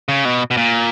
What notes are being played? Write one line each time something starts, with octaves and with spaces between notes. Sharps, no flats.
C#3
B2
B2
A#2